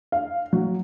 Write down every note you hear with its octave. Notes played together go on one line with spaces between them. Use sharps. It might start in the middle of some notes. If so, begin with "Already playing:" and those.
F5
F#3